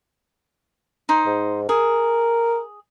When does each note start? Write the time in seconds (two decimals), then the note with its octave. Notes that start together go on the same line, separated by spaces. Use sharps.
1.09 D#4 C5
1.26 G#2
1.69 G#4 A#4